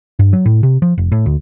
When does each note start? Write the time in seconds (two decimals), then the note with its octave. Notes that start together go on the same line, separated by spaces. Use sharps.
0.19 G2
0.33 F#3
0.46 A2
0.63 C3
0.82 F3
0.98 F1
1.12 A2
1.26 D2